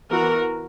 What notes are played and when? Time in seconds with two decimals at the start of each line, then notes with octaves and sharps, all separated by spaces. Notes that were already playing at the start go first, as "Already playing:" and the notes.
0.10 E3 B3 F#4 A#4